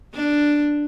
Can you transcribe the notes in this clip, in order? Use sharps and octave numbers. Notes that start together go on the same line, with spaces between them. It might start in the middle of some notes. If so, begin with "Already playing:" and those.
D4